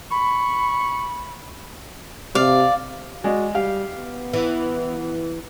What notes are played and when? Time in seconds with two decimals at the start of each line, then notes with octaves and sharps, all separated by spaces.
0.11 B5 C#6
2.35 C3 D5 F5
3.24 G#3 F#4 D5
3.54 G3 G4 F5
3.95 B3
4.33 E3